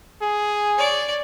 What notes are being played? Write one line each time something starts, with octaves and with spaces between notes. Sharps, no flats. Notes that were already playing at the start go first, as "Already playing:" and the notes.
G#4
C#5 D5